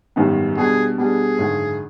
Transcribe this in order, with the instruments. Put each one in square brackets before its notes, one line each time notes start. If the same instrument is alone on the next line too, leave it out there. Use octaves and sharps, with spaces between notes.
[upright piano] G#1 F#2 D#3 G3 B3
[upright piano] B2 G3 B3 D4 [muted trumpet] G#4
[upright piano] B2 G3 B3 D4 [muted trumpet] G#4
[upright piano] G#1 F#2 D3